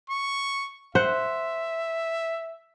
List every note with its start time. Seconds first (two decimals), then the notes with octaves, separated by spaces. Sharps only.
0.10 C#6
0.95 C5 E5 F#5